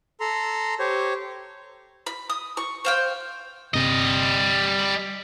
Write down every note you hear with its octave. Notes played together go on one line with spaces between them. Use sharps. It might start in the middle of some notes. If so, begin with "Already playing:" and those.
A4 A#5 C6
G4 C5 C#5
B5
D#6
C#6
C5 F5 G5
G1 C3 G3 D#5